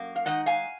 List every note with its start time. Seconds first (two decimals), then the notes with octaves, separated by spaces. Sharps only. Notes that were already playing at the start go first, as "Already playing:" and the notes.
Already playing: F#2 A#3
0.16 F5
0.26 D#3 G#3 D#4 D#5 F#5
0.46 F5 G#5